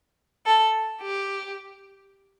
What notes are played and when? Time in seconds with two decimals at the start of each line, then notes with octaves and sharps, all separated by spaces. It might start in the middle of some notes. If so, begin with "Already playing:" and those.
0.46 A4
1.01 G4